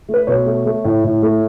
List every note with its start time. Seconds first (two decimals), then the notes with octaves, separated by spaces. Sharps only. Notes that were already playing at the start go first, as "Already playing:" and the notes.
0.09 A3
0.14 B4
0.27 B2 C#5
0.46 A3
0.66 A3
0.85 A2
1.04 A2
1.22 A3